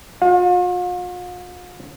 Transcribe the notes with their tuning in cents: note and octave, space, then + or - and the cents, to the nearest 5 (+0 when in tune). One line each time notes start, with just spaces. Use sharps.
F4 +45 F5 +40